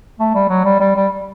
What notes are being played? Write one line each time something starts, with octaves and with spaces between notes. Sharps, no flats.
A3
G3
F#3
G3
G3
G3